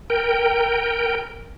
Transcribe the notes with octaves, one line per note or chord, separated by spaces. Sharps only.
A#4 G5